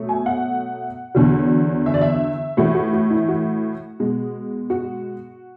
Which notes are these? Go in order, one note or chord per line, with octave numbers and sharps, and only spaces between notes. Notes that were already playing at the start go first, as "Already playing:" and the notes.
Already playing: B2 F#3 A3
G#5
F#5
E2 D3 F#3
E5
D5
E5
A2 E3 A3 F#4
F#4
F#4
E4
F#4
B2 G#3
F#4